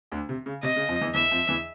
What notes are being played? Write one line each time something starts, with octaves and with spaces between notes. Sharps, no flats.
D2 D3
C3
C#3
C3 D#5
C#3
F2 F3
E2 E3
E2 E3 E5
F2 F3
E2 E3